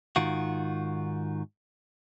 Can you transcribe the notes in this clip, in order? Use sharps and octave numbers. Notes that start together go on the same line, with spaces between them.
G#2 D#3 F4 F#4